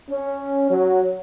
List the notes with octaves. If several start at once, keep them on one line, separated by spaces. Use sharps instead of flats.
C#4
F#3